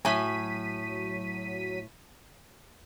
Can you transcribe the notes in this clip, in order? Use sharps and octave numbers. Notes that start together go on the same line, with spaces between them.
A2 F#3 G#5 B6 D#7